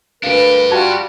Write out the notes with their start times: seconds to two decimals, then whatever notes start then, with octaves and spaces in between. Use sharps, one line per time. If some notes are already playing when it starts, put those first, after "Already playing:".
0.23 D2 D4 G4 A#4 B4 F5
0.71 G3 F4 F#4 A5 G#6